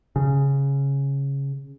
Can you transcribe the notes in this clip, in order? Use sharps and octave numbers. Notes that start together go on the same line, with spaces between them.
C#3